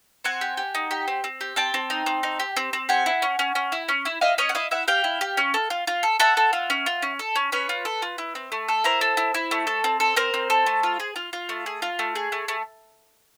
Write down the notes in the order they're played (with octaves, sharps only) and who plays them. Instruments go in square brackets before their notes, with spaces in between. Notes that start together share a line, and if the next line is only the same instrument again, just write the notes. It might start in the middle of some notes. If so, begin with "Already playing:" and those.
[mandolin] C4 F#5 G#5
G4
G4
D#4
G4
C4
C4
G4
C4 G5 A5
C4
D#4
C4
D#4
G4
C4
C4
G4 F#5 G#5
E4
C#4
C#4
C#4
E4
C#4
E4
E4 D#5 F5
C#4 C#5 D#5
F#5
E4 D#5 F5
E4 E5 F#5
G4 F5 G5
E4
G4
C#4
A4
F4
F4
A4
A4 E5 F#5
A4
F4
C#4
F4
C#4
A4
C#4
C#4 B4 C#5
F4
A4
F4
E4
C4
A3
A4
E4 A#4 C5
A4
E4
E4
A3
A4
C4
A4
C4 A#4 C5
C4
A4
A3
F4
G#4
F4
F4
A3
G#4
F4
A3
G#4
A3
A3